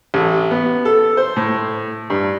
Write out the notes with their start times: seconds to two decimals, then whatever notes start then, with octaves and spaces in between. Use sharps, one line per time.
0.14 A1
0.51 B3
0.85 A4
1.17 C5
1.36 A2
2.10 G2